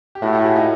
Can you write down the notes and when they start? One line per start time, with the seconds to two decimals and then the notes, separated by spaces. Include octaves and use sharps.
0.15 G4
0.22 A2 E4 F#4
0.33 G4 A4
0.44 F#4 G#4
0.56 D#4 F4